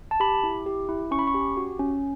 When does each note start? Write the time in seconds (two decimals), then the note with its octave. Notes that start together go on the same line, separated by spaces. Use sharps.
0.11 A5
0.20 G4 B5
0.43 E4
0.66 G4
0.89 E4
1.11 C#4 C#6
1.19 B5
1.27 C#6
1.34 G4
1.57 F#4
1.79 C#4